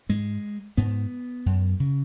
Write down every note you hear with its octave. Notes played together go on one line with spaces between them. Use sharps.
G#2 G#3
G#2 B3
F#2
C#3